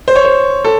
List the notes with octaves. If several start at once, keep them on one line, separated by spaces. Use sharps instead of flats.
C5
C#5
C5
A4